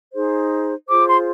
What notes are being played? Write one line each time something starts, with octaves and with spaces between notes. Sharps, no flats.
D#4 G#4 C5
F4 G#4 C5 D6
C6